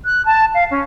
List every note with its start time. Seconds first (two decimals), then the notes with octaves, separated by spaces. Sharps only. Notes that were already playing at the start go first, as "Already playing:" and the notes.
0.05 F#6
0.25 A5
0.54 F5
0.70 C#4